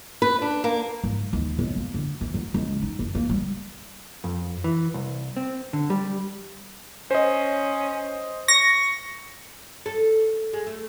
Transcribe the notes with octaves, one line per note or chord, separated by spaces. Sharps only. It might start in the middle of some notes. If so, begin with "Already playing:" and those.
B4
D4
A#3
G#2
D#2
B1
F3
D3
E3
F#3
C#2
D#4
F#1
A#3
G3
F2
E3
C2
C4
D3
G3
C#4 C5 D#5
C#6 A#6
A4
G#3
A3